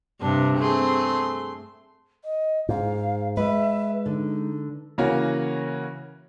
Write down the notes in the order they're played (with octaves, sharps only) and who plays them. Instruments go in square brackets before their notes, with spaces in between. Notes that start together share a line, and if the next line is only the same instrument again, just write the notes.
[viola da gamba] G2 C3 [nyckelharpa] D4
[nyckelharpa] A3 C6 [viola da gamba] C4 G#4
[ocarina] D#5
[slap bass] G#2 [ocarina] F5
[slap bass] G#3 [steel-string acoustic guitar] B4 [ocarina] E5
[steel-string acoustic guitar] D3 [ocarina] D#4
[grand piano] C#3 E3 A#3 C#4 F#4 C#5